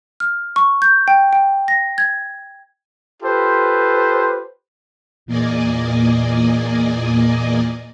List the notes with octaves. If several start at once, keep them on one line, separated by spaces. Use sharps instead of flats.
F6
C#6
G6
G5
G5
A#6
G#6
F4 G4 A4 B4 C5
E2 A#2 A#3 D5 D#5 G#5